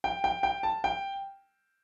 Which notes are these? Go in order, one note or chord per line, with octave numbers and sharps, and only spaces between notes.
G5
G5
G5
A5
G5